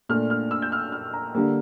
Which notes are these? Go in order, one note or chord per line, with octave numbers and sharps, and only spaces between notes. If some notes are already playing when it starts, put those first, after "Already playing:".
A#2 A3 D4 F6
F6
E6
G6
F6
F6
A#5
D3 G3 A#3